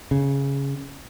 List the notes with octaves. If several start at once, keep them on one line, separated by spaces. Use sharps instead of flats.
C#3